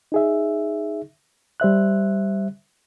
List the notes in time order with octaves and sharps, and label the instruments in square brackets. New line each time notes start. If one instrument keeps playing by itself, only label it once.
[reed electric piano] D#4 G#4 E5
G3 C5 E5 F#6